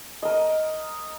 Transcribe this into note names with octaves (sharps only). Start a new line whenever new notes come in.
A#4 D#5